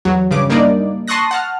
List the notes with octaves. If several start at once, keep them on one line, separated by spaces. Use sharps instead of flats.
E2 F#3
G2 C#3 D6
G3 A#3 D4 D#4 D5
A5 C6 C#6 D#6 F#6 A#6
F#5 A5 F6